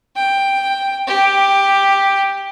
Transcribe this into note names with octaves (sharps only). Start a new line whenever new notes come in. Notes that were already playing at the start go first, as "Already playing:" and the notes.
G5
G4